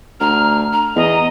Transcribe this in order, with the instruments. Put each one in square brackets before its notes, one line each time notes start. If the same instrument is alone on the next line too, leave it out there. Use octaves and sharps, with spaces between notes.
[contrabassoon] D2 [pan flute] A#5 [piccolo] F6
[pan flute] A#5
[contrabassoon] E2 [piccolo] D#5